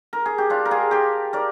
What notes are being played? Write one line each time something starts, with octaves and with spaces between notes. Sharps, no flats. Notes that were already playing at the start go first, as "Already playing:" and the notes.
A#4
G#4
G4
D4 F4
A#4
F4 G#4
G4 A#4
A#4 D5